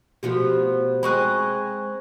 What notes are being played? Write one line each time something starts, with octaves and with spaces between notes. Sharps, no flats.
B2 F3 A3 F#4 G4
G#3 C4 G#4 B5 C#6 F#6